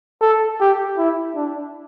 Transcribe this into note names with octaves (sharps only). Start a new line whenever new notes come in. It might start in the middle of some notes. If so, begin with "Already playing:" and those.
A4
G4
E4
D4